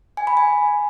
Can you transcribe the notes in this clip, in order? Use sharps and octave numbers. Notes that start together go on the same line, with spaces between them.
G#5
B5
G#5